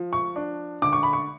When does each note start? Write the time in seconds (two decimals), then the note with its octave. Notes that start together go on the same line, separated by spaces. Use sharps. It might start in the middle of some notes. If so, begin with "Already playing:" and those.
Already playing: F3
0.13 C#6
0.36 D4
0.82 D3 D6
0.93 C#6
1.03 B5
1.13 C#6